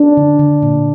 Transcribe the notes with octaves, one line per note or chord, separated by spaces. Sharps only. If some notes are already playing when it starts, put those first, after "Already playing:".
Already playing: D4
D3
D3
A#2